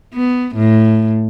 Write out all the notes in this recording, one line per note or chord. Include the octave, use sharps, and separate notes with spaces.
B3
A2